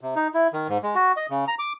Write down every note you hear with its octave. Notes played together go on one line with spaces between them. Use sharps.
C3
D#4
E4
D#3
G#2
G#3
F#4
D#5
C#3
A#5
D6